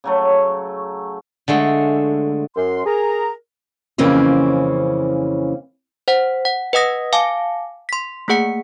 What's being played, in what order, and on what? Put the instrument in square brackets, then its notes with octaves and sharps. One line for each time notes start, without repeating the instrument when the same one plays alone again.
[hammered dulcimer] C#3 F#3 A3
[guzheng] D3 G#3 A3
[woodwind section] F#2 C6
G#4 A#4 A#5
[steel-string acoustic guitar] F2 C#3 E3 A#3 C4 C#4
[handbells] C5 F#5
F#5
B4 D#5 F#5 D#6 A#6
F5 G#5 A5 D6
C6 B6
A3 A#3 G#4 F#5 C#7